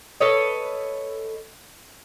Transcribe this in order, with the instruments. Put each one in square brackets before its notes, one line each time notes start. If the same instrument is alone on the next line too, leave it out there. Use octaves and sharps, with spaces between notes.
[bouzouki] A4 B4 C#5 D#5